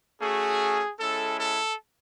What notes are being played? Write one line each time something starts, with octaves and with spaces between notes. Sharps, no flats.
A3 C#4 F#4 G#4
G#3 C#4 E4 A4
A4